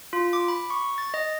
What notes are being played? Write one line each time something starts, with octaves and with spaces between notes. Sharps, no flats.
F4
D6
B5
C#6
A6
D#5